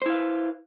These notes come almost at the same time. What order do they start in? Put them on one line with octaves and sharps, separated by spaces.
C5 E4 F5 B4